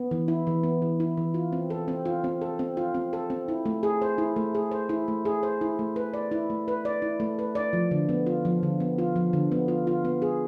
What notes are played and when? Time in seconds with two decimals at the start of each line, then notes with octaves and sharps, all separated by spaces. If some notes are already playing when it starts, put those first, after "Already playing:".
Already playing: B3
0.11 E3
0.28 E4
0.47 E3
0.63 B3
0.82 E3
1.00 E4
1.17 E3
1.34 F4
1.53 C4
1.70 A4
1.88 C4
2.05 F4
2.24 C4
2.41 A4
2.59 C4
2.77 F4
2.94 C4
3.13 A4
3.30 C4
3.48 E4
3.66 A3
3.83 G#4
4.02 C5
4.18 E4
4.36 A3
4.55 G#4
4.71 C5
4.89 E4
5.08 A3
5.25 G#4
5.43 C5
5.61 E4
5.79 A3
5.96 B4
6.14 D5
6.32 E4
6.50 A3
6.68 B4
6.85 D5
7.02 E4
7.20 A3
7.39 B4
7.55 D5
7.73 F3
7.91 D3
8.09 B3
8.26 F4
8.45 F3
8.63 D3
8.80 B3
8.98 F4
9.16 F3
9.33 D3
9.52 B3
9.68 F4
9.87 F4
10.05 B3
10.22 G#4